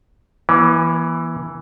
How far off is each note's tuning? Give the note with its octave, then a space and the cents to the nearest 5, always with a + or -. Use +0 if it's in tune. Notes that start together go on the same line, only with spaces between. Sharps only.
E3 +0 A#3 +40